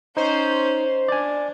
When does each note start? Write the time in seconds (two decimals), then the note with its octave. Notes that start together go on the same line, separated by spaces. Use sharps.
0.17 C#4 D#4 C5
1.08 D4 D5 G#5